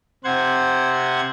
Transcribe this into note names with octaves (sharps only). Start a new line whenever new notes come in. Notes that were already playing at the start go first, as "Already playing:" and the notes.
C3 C5 F#5 G#6